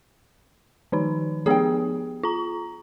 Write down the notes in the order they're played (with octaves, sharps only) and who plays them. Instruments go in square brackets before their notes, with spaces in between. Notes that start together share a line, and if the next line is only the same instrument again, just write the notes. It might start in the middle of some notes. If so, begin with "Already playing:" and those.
[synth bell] D#3 F3 D#4
[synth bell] F3 B3 G4 [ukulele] G#4 G5
[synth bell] F4 A#5